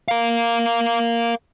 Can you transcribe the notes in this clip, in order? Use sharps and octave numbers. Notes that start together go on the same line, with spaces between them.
A#4 F5